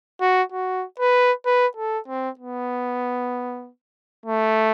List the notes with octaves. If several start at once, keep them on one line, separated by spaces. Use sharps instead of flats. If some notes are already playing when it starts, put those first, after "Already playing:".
F#4
F#4
B4
B4
A4
C4
B3
A3